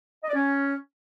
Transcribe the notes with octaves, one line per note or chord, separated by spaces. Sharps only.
D#5
D5
C#4